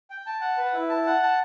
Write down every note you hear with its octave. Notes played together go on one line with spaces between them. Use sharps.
G5
A5
F#5
B4
E4
A5
F#5
A5